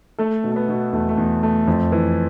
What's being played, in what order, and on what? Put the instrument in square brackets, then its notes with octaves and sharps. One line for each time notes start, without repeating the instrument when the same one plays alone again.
[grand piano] A3 A4
B2
A3
B3
B2
E2 A3
A3
E2
A3
F2
E3